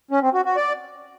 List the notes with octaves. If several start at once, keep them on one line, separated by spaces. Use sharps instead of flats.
C#4
C4
F#4
F#4
D5